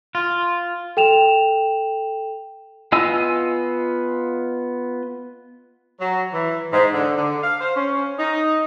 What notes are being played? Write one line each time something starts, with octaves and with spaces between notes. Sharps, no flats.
F4
A4 G5 E7 F7
B3 F4 D#5 G#5 E6
F#3
E3
G#2
D3
D3
F5
C5
C#4
D#4